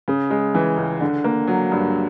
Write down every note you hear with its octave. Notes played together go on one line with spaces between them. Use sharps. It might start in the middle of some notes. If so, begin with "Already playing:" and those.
C#3
G#3
E3
C#2
D3
A#3
F#3
G2